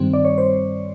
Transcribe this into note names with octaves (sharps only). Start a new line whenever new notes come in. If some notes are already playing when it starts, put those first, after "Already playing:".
Already playing: G2 D#3 G3 C4
D5
C#5
C5